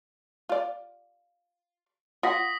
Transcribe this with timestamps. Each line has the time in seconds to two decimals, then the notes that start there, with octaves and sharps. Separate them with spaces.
0.49 F4 D5
2.23 F4 F#5 D#6 A#6 B6